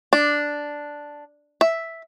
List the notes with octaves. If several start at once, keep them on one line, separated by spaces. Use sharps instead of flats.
D4
E5